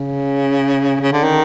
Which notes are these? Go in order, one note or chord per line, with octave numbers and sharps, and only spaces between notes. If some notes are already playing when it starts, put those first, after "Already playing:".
Already playing: C#3
C#3
D3
D#3